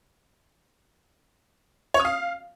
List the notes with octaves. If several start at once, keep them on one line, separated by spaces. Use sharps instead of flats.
C#5
D#6
F5